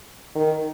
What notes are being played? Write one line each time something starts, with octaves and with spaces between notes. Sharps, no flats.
D#3